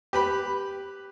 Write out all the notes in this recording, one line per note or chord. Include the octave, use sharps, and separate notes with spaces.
G4 B4 B5